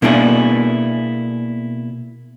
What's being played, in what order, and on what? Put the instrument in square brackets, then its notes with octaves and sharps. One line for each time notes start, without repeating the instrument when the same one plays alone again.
[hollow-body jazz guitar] B2 A#3 D4 E4 F4 G#4